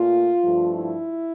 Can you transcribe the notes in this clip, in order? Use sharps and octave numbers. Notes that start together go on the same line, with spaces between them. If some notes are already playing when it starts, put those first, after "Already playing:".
Already playing: A#2 A3 F4
G2 F3 A3
E4